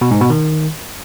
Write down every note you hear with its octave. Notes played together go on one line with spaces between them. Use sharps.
B2
G#2
B2
D#3